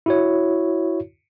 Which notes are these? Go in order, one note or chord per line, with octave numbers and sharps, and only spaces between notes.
E4 F#4 C#5